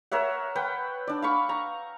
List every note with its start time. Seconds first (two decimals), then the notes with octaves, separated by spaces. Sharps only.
0.12 A#4 C#5 E5 F#5
0.55 B4 F#5 G5
1.07 D4 D5
1.22 F5 B5 C#6
1.49 A#5